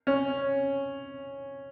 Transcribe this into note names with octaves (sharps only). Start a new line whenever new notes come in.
C#4